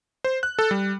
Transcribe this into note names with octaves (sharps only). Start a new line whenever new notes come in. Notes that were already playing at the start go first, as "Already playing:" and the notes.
C5
F#6
A4
G3